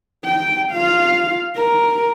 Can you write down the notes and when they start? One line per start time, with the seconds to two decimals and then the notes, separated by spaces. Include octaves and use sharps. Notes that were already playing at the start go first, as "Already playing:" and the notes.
0.24 G5
0.72 F4 F5
1.56 A#4